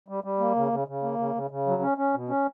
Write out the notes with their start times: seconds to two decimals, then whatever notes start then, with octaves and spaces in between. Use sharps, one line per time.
0.08 G3
0.24 G3
0.39 A#3
0.56 C#3
0.72 C#3
0.88 C#3
1.03 A#3
1.19 C#3
1.35 C#3
1.51 C#3
1.67 F#3
1.82 C#4
1.98 C#4
2.14 B2
2.29 C#4